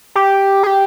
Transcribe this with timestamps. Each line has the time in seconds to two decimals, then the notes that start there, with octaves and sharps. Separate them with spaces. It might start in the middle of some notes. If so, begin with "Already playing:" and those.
0.15 G4
0.63 G#4
0.67 G4